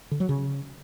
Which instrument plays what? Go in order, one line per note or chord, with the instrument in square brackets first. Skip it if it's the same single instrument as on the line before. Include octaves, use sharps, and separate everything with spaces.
[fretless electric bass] D3
F#3
C#3